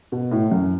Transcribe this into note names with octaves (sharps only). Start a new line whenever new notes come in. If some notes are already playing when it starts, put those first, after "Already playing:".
B2
A2
F#2